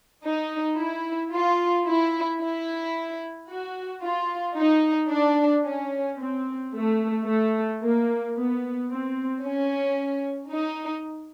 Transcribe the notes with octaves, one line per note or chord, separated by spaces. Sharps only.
D#4
E4
F4
E4
E4
F#4
F4
D#4
D4
C#4
C4
A3
A3
A#3
B3
C4
C#4
D#4